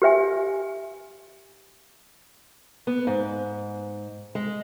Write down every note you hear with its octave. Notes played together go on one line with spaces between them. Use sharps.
G4 B4 E5 G#5
B3
G#2
G#3